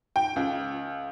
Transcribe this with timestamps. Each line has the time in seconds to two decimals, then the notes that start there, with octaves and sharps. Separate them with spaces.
0.16 G5
0.36 C#2